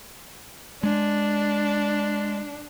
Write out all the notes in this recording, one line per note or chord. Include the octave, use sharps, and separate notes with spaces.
G#3 D4